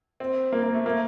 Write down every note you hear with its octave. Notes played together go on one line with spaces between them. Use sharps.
C4
A#3
A#3
A3
A#3